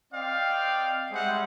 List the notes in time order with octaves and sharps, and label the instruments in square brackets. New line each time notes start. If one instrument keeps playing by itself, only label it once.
[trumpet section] C4 D5 D#5 F5 G5
G3 G#3 G#4 C5 E5 F#5